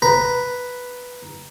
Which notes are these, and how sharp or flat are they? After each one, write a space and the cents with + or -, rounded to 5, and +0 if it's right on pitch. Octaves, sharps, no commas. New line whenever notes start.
B4 +0 A#5 +10